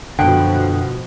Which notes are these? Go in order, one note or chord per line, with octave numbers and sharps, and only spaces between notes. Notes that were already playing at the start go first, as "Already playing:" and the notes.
F#2 B2 D3 F3 G5 D#6 F#6